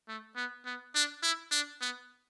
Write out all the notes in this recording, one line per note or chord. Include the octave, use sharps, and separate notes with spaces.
A3
B3
B3
D4
E4
D4
B3